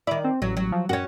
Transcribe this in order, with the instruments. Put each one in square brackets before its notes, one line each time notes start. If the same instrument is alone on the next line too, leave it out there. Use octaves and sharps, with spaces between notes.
[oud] D#3 D5 [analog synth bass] E4
[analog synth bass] C4
[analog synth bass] A1 [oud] F#3
[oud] F#3
[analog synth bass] F3
[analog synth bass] F#2 [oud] C#4 F#4